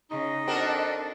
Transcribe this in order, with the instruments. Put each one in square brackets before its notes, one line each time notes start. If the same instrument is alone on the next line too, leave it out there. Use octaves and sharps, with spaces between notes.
[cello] C#3 [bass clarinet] D#4 [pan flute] D#5
[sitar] C4 F#4 A#4 [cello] D4 A4